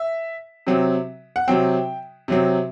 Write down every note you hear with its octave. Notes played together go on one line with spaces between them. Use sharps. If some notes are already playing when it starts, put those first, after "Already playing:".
Already playing: E5
C3 F#3 C4
F#5
C3 F#3 C4 G5
C3 F#3 C4